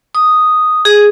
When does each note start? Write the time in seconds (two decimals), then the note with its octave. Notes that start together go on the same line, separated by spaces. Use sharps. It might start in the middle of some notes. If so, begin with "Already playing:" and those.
0.15 D#6
0.85 G#4